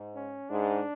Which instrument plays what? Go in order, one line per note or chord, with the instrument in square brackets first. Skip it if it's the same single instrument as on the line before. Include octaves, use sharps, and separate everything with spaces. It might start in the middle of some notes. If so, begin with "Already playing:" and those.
Already playing: [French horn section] G#2
[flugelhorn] C#4
[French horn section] G#2 [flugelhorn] D4